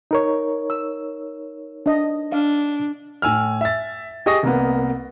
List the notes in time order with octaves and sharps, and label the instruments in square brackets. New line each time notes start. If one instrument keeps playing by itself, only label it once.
[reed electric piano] D#4 A#4 C#5
[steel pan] E6
D4 D#5
[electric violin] D4 [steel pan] F5
[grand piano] A2 G#5 E6 F6
E5 A6
G4 G#4 D#5 C#6 D#6 A#6
C2 A#3 B3